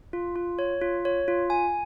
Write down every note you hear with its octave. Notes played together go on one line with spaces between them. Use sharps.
F4
F4
C#5
F4
C#5
F4
G#5